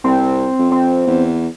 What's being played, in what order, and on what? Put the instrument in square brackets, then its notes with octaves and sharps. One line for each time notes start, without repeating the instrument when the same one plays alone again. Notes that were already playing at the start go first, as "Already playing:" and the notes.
[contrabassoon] C2 [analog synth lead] C4
[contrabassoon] F2
[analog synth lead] C4
[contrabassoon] E2